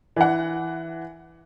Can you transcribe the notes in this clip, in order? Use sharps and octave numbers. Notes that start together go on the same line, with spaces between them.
E3 F#5